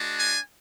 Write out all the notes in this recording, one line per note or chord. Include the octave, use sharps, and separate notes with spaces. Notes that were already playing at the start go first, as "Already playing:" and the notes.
Already playing: G#3 D4 F#4
G#5